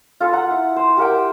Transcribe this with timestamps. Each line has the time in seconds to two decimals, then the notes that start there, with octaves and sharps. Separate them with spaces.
0.20 F4 A4 B4
0.32 F#5 A#5
0.51 E4
0.76 C5
0.97 G4 A#4 F#5 G5